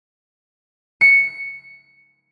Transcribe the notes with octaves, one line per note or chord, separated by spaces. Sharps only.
C#7